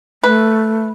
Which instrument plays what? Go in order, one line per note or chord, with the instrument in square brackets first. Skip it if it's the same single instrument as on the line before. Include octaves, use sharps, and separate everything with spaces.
[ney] A3 [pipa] B4